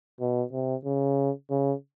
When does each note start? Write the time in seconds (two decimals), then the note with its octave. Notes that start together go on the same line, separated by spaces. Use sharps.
0.20 B2
0.52 C3
0.85 C#3
1.50 C#3